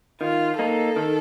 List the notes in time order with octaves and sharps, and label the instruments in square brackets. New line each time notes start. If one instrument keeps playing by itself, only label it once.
[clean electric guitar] D#3 [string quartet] F4
[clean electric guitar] A#3 D#4 [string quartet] A4
[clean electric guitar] D#3